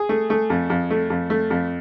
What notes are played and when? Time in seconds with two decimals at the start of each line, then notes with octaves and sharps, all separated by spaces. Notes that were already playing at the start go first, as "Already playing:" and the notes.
Already playing: G#4
0.09 A3
0.30 A3
0.50 F2
0.70 F2
0.91 A3
1.10 F2
1.30 A3
1.50 F2